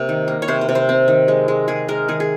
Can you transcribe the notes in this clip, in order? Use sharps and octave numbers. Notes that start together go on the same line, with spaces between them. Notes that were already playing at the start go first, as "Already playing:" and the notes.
Already playing: C3 A#3
D#3
A#3
C#5
C3 C5
C5
C3
C5
C4
D#3
G#3
G#3
D#3 G#4
G#3 A#4
D#3 G#4
G#4